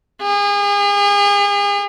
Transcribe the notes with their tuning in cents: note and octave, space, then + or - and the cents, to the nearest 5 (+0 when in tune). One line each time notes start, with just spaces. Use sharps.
G#4 -40